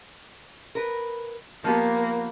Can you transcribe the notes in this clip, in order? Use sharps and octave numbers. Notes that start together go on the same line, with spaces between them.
A#4 B4
F3 A#3 B3 G4